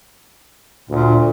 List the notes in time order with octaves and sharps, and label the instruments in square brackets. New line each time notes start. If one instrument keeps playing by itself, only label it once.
[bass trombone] D2 [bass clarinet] A#2